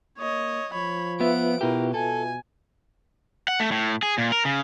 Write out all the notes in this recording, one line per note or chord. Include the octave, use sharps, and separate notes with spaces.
A#3 C#5 D#5
F3 C#5 B5
B3 F4 B4 E5 F#5 D7
B2 E4 G4 A#4
B2 A4 G#5
F#5
A3
A2
G#4
A#2
A#4
C#3